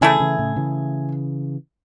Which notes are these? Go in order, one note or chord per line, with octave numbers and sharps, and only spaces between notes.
C#3 E3 A3 E4 G#4
C#3 E3
A2 C#3
C#3 E3